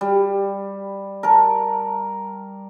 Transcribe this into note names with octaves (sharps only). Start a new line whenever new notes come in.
G3
A#4 A5